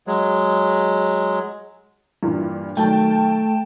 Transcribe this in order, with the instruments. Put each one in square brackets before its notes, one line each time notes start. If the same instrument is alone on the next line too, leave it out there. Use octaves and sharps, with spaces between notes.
[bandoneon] F#3 G#3
[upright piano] G2 A#2 E3
[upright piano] D#3 F#3 [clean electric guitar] A3 [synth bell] G5 A5